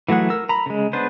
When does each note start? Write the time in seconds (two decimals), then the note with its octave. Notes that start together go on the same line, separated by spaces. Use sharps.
0.08 E3 F#3 A3 G#4 F#5
0.30 A#4 E6
0.49 A#5 B5
0.66 C#3 G#3
0.93 B3 D4 G#4 B4 C5